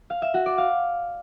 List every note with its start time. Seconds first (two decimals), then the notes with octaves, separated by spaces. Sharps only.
0.10 F5
0.22 E5
0.34 F#4
0.46 D5
0.58 F5